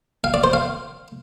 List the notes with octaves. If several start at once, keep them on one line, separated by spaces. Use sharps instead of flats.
F5
D5
C5
F5